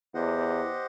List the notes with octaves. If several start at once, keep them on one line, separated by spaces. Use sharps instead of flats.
E2 G4 C5 D#5 F#5